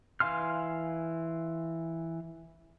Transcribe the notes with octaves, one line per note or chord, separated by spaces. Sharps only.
E3 F5 G#5 C6 F6